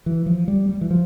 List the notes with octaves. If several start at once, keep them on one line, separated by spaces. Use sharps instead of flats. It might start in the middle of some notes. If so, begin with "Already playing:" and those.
E3
F3
G3
G3
E3
F3